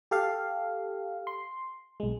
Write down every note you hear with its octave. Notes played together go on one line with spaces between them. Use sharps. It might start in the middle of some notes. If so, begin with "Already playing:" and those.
G4 A4 F5
C6
B1 G#3